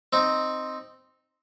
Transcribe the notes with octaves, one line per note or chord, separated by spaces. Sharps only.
C4 D#4